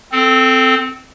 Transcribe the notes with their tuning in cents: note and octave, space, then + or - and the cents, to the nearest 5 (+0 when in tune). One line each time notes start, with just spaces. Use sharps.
C4 -10 A4 +0